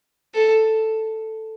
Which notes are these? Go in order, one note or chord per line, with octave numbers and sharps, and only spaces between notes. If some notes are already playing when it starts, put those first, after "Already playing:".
A4